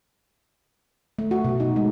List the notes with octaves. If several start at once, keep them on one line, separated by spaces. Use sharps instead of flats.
A3
F#4
B2
D#4
G#3